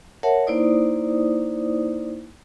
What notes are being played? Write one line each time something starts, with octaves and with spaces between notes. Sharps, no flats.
A#4 C#5 E5 F#5 A5
A#3 D#4 E4 C5 D5 D#6